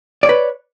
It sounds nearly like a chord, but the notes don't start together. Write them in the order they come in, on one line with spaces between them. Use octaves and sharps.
D5 C#5 B4